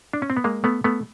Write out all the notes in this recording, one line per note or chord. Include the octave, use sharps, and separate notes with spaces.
D4
C#4
C4
B3
G#3 A#3
A3 B3
A3 B3